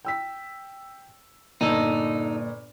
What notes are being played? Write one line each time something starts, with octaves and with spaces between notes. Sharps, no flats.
G5 E6 B6
G1 A#2 D#4 A4